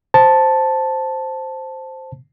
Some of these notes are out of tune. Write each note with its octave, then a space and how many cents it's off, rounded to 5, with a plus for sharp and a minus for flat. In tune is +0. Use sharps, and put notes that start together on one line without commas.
C5 +0 A5 +0